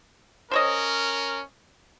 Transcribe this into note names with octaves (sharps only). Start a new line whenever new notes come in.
C#4 A#4 C5 C#5 D#5